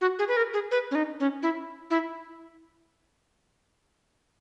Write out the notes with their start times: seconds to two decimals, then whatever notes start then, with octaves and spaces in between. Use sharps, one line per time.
0.01 F#4
0.19 G#4
0.28 B4
0.37 A#4
0.53 G#4
0.71 B4
0.91 C#4
0.95 D#4
1.20 C#4
1.43 E4
1.90 E4